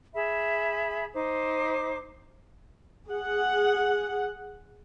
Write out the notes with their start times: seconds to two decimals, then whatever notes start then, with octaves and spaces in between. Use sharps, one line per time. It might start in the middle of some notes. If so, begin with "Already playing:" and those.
0.15 G#4 E5 B5
1.13 D#4 C5 D6
3.08 G#4 F#5